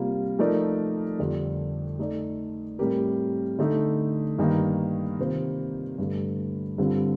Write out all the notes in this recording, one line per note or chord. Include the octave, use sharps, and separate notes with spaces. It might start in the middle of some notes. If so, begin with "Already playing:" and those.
Already playing: C3 G3 A#3 F4
F3 A3 D#4 A#4 D5
F2 D3 G3 D4 G4
A3 D#4 A4 D5
A2 G3 C4 G4 A#4
D3 A3 D#4
G2 D#3 A#3 D#4
C3 D#3 A#3 F4 C5
G2 D3 A3
G2 D3 G3 C4 F4